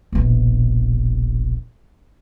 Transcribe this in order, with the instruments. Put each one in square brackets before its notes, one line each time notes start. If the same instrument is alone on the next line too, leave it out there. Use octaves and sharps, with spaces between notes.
[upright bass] E1 A#1